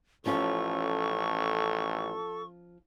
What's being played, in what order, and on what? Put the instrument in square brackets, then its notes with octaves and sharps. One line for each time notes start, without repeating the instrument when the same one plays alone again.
[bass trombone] A1 [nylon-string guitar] F3 C#4 F4 [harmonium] A4 [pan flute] C#6